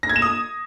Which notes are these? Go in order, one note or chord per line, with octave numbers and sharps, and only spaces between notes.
A#6
G#6
E7
D#6